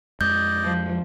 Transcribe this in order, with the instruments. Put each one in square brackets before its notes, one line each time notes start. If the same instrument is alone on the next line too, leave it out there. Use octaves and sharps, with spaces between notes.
[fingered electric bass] F2 G#3 [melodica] D5 D#5 [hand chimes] G6
[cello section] F3